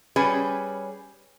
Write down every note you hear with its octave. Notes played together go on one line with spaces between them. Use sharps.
G3 C#4 G#4 B4